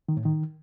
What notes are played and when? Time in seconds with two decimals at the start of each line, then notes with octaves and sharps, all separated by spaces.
0.09 D#3
0.17 A2
0.25 D#3